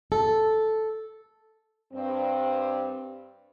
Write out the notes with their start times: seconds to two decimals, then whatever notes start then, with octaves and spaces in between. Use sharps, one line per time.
0.12 A4
1.93 G2 C4